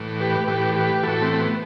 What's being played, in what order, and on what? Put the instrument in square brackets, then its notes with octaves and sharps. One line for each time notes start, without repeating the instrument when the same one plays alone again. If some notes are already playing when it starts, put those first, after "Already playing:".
Already playing: [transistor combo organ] A2 E3
G4 B4
A2 E3 G4 B4
G4 B4
A2 E3 F#4 A4
A3 C4
C4
B3